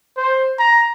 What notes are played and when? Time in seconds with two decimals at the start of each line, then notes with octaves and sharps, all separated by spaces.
0.17 C5
0.59 A#5